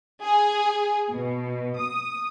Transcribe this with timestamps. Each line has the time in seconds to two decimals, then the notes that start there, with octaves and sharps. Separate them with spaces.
0.24 G#4
1.12 B2
1.78 D#6